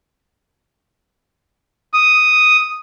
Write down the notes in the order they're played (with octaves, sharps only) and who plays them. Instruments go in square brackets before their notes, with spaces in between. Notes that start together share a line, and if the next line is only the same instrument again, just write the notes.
[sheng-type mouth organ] D#6